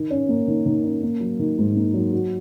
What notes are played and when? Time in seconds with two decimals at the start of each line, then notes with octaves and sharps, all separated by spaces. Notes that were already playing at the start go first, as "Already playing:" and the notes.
Already playing: D#3
0.10 C#4
0.29 A#3
0.48 D#3
0.66 D#3
0.84 C#4
1.03 A#3
1.20 F#3
1.39 D#3
1.58 G#2
1.76 A#3
1.94 F#3
2.13 F#4